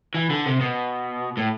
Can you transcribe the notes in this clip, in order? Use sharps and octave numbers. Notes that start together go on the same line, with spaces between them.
E3
D3
C3
B2
A2